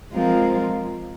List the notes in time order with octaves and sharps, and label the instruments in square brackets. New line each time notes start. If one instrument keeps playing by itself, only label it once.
[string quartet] F3 G#3 C4 F4 A#4